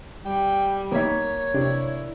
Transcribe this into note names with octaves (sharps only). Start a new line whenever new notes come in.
G3 G5
A#3 B3 D#4 C#5 B6
C3 D4 E4